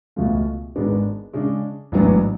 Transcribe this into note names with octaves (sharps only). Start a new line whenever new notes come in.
C#2 B2 A3 F4
G#1 G#2 G#3 B3 D4
C#3 G#3 D4
A1 G#2 F#3 B3 D4